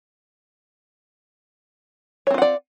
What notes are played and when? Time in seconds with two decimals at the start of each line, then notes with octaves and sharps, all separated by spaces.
2.27 C#5
2.31 C4
2.34 F4
2.38 F#5
2.42 D5